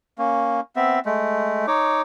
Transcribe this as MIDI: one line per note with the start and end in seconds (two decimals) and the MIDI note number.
0.19 0.60 58
0.19 0.60 61
0.76 0.99 59
0.76 0.99 60
0.76 0.99 76
1.06 1.66 56
1.06 1.66 57
1.68 2.02 63
1.68 2.02 73
1.68 2.02 86